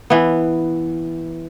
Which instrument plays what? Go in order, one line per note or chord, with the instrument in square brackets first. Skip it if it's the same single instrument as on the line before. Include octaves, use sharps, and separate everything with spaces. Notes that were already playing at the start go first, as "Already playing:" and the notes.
[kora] E3 B3